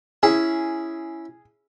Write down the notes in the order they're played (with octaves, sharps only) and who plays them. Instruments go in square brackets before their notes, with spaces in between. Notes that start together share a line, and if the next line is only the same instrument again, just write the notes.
[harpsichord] C#4 E4 [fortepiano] G#4